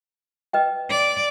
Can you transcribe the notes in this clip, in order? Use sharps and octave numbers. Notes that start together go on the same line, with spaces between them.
B4 D#5 G5
D5